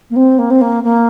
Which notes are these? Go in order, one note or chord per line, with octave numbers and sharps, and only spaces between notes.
A#3
C4
A#3
C4
A#3
A#3